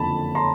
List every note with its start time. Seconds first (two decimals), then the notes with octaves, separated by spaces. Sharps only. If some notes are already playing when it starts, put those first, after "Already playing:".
Already playing: F#1 F2 D3 A5 B5
0.35 A#5 C6